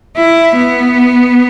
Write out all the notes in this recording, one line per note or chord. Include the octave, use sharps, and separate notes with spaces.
E4
B3